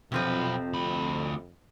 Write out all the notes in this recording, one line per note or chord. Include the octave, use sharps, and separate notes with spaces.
B1 F2 C3 F3 C4 B4
D2 B5